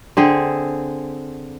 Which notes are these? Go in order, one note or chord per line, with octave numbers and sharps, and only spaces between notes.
D3 C4 G#4